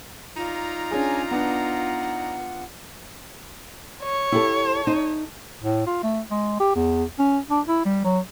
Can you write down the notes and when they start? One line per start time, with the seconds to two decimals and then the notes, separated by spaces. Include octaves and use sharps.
0.36 D#4 F4 D5 A#5
0.91 C#4 D4 G#4 G#5
1.31 B3 D4 F#5
4.03 C#5
4.32 E4 G4 A4
4.87 D#4
5.63 A2
5.86 F4
6.03 A3
6.31 G#3
6.60 G4
6.76 E2
7.19 C#4
7.50 D4
7.67 E4
7.85 G3
8.05 F#3